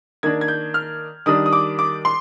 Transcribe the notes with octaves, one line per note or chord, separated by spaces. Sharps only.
D#3 A#3 D4 G#6
G#6
G6
F6
D#3 G3 D4 D#6
D#6
D6
D6
C6